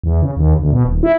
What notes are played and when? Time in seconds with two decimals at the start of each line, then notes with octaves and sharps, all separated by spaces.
0.04 E2
0.22 C#3
0.37 D#2
0.59 D2
0.72 B2
0.85 D#1
1.03 E4